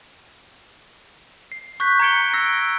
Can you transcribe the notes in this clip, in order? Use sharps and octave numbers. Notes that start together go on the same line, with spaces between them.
C7
C#6 F#6 G6 B6
A#5 F#6 G#6 C#7 D7 G7
E6 A#6 C7 D7